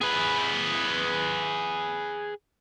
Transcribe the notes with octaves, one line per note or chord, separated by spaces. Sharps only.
G#4 B4